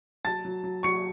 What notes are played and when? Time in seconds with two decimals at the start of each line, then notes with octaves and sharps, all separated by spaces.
0.25 F#3 A5 A6
0.45 F#3
0.64 F#3
0.83 F#3 C#6 C#7